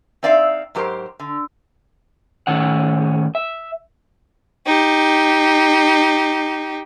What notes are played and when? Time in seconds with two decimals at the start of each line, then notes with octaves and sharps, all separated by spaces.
0.23 C4 D#4 D5 E5 F5
0.75 G#2 F#3 G4 A#4 C5
1.20 D3
2.47 A2 D#3 C#4 F#5
3.35 E5
4.66 D#4 G4